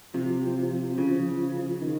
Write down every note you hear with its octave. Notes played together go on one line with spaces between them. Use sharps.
C3 F3
F3
F3
F3
F3
F3
C#3
F3
F3
F3
F3
D#3